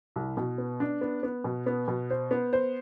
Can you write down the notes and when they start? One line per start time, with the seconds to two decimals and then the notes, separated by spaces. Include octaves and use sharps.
0.16 C2
0.37 B2
0.58 B3
0.80 D4
1.01 B3
1.23 B3
1.44 B2
1.66 B3
1.88 B2
2.10 C5
2.31 B3
2.53 C5